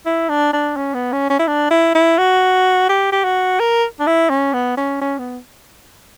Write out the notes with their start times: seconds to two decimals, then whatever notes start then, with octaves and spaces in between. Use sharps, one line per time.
0.06 E4
0.29 D4
0.53 D4
0.76 C#4
0.94 B3
1.12 C#4
1.30 C#4
1.39 E4
1.47 D4
1.70 E4
1.95 E4
2.18 F#4
2.89 G4
3.12 G4
3.24 F#4
3.60 A#4
4.00 D4
4.07 E4
4.30 C#4
4.53 B3
4.77 C#4
5.01 C#4
5.19 B3